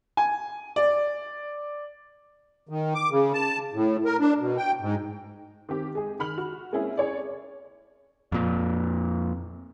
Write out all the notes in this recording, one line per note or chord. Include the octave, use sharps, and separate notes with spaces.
G#5
D5
D#3
D6
C#3
A5
A2
A#4
D4
B2
G5
G#2
D#3 C4 G4
G#3 G#4
D#3 B5 F6 F#7
F#4
G#3 A#3 C4 C#4 E4 G#4
G#4 C#5 D5
F2 A#2